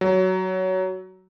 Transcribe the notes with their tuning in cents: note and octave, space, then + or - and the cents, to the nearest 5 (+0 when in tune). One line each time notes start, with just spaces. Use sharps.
F#3 +15